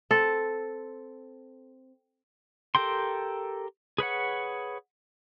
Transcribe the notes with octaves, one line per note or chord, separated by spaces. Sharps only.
C4 A4
G4 A4 A#4 G5 C6
G#4 B4 C#5 F#5